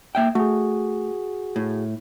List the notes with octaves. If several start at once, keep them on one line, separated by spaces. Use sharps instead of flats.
A#3 E5 G5
A3 F#4 G#4
A2